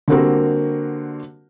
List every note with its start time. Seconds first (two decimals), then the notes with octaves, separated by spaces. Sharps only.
0.08 D3 G3 A#3 C4 F#4 A#4